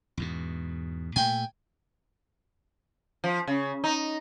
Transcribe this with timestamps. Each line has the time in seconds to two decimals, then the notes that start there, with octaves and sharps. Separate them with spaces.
0.17 E2 G#2 B2
1.16 A#2 A3 G5 G#5
3.24 F3
3.47 C#3
3.84 D#4